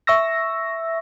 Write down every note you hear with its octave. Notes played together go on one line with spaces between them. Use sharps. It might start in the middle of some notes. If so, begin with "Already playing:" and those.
E5 C#6 E6 A#6